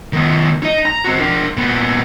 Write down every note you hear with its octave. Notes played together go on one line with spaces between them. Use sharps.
D#3 B3
D#4 D#5
A#5
C4 F#4
D4 A#4
A#2 B3